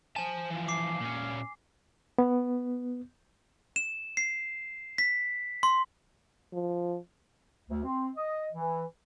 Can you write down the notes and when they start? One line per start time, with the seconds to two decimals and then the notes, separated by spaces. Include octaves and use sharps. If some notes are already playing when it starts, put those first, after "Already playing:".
0.16 C5 G#5 A5
0.50 E3 F3
0.68 D6 C7
1.00 A#2 C#4
2.19 B3
3.76 E7
4.17 C7
4.98 B6
5.63 C6
6.53 F3
7.70 D2
7.84 C4
8.16 D#5
8.53 E3